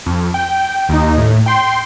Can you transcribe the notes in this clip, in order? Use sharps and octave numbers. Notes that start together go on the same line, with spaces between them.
F2
G5
D#2 D#4
A2
G5 C6